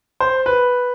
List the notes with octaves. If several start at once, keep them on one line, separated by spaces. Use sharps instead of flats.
C5
B4